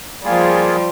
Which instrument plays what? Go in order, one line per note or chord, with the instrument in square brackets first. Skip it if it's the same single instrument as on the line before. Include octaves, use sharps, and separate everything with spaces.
[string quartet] F3 G3 [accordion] A#3 F4 G#4